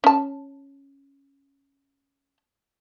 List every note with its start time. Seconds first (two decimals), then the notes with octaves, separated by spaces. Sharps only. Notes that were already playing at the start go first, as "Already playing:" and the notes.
0.04 C#4 A5